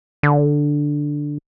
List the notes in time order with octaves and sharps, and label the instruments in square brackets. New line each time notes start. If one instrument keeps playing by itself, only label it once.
[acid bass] D3